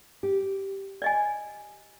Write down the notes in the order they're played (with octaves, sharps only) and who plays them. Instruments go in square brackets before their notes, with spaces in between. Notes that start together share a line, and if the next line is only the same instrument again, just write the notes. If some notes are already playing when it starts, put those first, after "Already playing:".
[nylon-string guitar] G4
[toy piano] D5 D#5 G#5